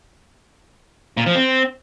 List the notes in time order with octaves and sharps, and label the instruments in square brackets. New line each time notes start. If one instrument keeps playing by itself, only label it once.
[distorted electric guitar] A#2
F3
C4